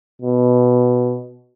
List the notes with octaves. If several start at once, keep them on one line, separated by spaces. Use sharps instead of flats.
B2